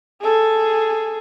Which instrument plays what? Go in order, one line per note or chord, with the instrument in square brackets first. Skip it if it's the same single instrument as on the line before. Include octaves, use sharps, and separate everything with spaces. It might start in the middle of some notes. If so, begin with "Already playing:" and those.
[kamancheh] G#4 A4